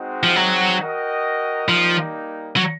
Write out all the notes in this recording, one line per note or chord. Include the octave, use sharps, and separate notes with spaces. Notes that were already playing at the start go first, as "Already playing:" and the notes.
Already playing: G#3 C4 D#4 F#4
F3
F#3
F#4 A#4 D#5 G5
F3 G3 A#3 D#4
F#3